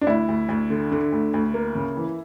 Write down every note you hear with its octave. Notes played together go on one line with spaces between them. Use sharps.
D4
D2 E4
D2
D2
D3
D3
D2
D2
A#3
C#3
E3